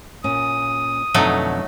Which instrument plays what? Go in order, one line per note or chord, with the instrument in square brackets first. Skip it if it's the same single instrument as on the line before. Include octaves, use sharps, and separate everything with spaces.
[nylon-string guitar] A#2 C#4 [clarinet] D#6
[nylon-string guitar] F2 B2 D3 [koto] F#3 A3 D#4